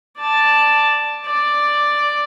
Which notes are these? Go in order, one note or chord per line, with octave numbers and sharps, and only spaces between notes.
D5 A5
D5